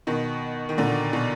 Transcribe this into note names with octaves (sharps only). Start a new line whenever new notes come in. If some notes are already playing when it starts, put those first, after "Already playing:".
B2 D#3
D#3
A#2 D3
B2